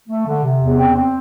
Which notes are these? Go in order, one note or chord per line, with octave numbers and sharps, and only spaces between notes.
A3
D3
C3
E2
C4
C4